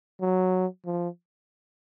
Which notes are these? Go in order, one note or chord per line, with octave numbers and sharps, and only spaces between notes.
F#3
F3